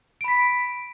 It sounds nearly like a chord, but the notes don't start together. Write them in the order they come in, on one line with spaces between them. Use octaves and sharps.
D7 B5 B6